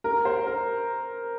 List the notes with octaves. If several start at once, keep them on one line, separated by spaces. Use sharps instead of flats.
A#4
C5
A#4